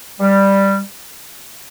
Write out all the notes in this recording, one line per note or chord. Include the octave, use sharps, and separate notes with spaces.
G3